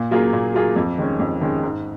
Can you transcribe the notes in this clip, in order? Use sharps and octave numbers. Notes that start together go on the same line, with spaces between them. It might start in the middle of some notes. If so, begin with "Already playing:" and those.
Already playing: A#2
F#3 A#3 F4 G#4
A#2
F#3 A#3 F4 G#4
F2
D#3 G#3 C#4
F2
D#3 G#3 C#4
G#2